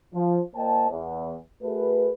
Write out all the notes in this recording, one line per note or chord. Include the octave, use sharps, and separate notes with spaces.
F3
A#2 A#3 C5 D#5 G5 A5
E2
A3 F#4 G#4 A#4 B4